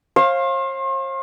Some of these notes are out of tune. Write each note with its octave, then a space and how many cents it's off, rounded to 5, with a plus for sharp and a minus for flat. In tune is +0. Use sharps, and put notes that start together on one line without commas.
C5 +45 F5 +0